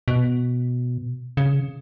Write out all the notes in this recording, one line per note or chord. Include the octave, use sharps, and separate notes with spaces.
B2
C#3